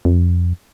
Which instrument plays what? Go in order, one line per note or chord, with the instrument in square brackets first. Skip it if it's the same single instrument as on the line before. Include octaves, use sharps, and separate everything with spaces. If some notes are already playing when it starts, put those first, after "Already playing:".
[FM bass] F2